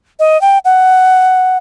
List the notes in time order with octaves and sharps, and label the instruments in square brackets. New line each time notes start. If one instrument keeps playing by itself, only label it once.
[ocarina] D#5
G5
F#5